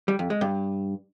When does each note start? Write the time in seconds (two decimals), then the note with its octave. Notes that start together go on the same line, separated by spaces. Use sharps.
0.08 G3
0.19 F2
0.30 G#3
0.41 G2